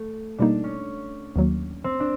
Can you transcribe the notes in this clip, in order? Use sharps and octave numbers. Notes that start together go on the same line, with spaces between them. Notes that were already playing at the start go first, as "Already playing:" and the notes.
Already playing: A3
B2 G3 A#3 D4 D#4
C#4
D#2 D#3 F#3 A#3
C4
D4